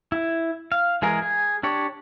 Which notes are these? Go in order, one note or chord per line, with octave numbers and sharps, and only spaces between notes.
E4
F5
E3 G#3 G#4 A#4
G#4
D4 G4 C#5